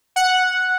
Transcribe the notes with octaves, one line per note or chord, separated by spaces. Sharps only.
F#5